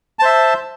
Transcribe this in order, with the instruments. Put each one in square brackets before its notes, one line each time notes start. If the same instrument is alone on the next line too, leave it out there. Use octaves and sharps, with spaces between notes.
[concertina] A5
C5
E5